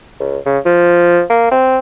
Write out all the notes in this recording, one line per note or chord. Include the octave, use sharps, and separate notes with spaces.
C#2
C#3
F3
A#3
C4